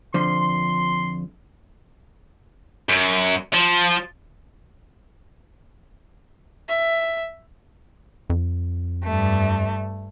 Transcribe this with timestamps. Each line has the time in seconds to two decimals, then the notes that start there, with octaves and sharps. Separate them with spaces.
0.14 F2 D3 F3 C6
2.89 F#2
3.54 F3
6.69 E5
8.30 F2
9.04 G2 A3